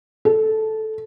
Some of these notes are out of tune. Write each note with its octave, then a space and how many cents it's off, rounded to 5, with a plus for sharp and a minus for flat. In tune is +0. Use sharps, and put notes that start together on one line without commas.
A4 -10